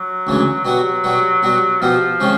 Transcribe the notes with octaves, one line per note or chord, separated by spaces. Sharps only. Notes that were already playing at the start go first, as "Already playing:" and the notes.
Already playing: F#3
D2 C#3 E3 G#3
B2 F#3 G3 B3
B2 G3 B3
B2 G3 B3
B2 F3 G3 B3
C3 D#3 G#3 C#4